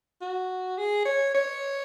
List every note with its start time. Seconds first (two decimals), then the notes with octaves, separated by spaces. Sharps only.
0.22 F#4
0.78 G#4
1.06 C#5
1.35 C#5